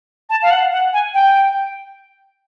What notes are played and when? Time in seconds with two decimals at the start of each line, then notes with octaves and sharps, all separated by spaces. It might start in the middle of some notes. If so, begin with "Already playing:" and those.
0.30 A5
0.42 F5
0.51 F#5
0.72 F#5
0.93 G#5
1.14 G5